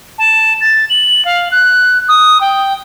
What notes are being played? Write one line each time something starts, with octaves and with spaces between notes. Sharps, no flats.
A5
A6
F#7
F5
F#6
D#6
G5